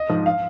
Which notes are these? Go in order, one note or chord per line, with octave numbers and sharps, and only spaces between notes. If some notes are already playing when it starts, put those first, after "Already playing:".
Already playing: D#5
G#2 F3
F5